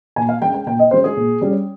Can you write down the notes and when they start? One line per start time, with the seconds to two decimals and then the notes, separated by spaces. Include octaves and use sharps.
0.16 A#2 G#5
0.29 F5
0.42 G#3 C#4 G5
0.54 G5
0.66 A#2 G5
0.79 D#5
0.91 G#3 C#4 C5
1.04 G#4
1.17 A#2
1.41 G3 C#4